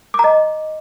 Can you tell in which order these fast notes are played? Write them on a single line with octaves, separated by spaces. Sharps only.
D6 A#5 D#5